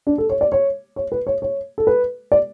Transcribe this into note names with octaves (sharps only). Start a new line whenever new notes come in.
D4
A4
C#5
D5
C#5
C#5
B4
C#5
C#5
A4
B4
D5